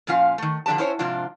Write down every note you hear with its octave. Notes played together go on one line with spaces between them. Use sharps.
A#2 F3 C#4 F4 F5
D#3 A3
D3 F3 D4 G4 A5
C#4 E4 C5 C#5
G#2 C3 F3 D4 F4